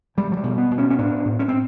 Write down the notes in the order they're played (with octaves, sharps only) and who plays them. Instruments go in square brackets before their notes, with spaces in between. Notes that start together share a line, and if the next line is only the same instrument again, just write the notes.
[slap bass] B2 G3
F#3
G3
B2
B3
B2
C#4
C#4
A2 D4
A2
C#4
C4